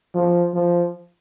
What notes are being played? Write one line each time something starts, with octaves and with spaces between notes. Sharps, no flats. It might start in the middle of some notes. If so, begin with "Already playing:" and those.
F3
F3